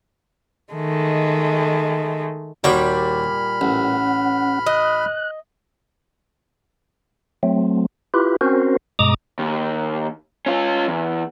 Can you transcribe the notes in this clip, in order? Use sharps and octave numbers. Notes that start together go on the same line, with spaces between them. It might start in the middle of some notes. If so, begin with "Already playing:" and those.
D#3 G#3 A3
D#2 A#2 G3 F#4 G5 B5 F6
A1 C#4 F#5
D#5 F#6
F#3 A3 C4
E4 F4 G4 B4
C4 C#4 F#4 A#4 C5
G2 B2 G#3 A#5 D6 D#6
D#2
C#4 F4
E2